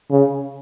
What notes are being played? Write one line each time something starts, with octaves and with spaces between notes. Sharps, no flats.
C#3